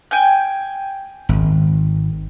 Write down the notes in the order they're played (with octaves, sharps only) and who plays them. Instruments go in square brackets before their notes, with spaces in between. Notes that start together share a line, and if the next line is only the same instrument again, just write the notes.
[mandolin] G5 G#5 G6
[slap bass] G#1